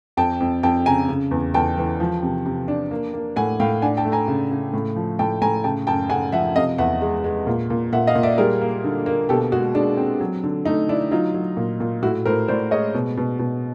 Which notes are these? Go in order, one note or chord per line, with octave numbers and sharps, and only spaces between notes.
F2 G5 A5
F2
F2 G5 A5
C#3 G#5 A#5
C#3
E2
E2 G5 A5
E3
F3
C3
C3
D4
A#3
A#3
A2 F#5 G#5
A2 F5 G5
D4 F#5 G#5
G5 A5
A3
G#5 A#5
C#3
C#3
A2
F3
A2 G5 A5
A2 G#5 A#5
C#3 G5 A5
F#2 G5 A5
C#3 F#5 G#5
F3 E5 F#5
C3 D#5 F5
E2 E5 F#5
G#3
G#3
A#2
A#2
A#2 E5 F#5
D#5 F5
A#2
D5 E5
G3 G#4 A#4
A#3
D3
A#3
B2 G4 A4
G#3 F#4 G#4
G#3 D4
C4
F#3
D3
A3 D#4
D3 D4 E4
F#3 D#4 F4
F#3
A#2
A#2
A2 E4 F#4
A2 A#4 C5
A2 C5 D5
G#3 C#5 D#5
B2
B2
B2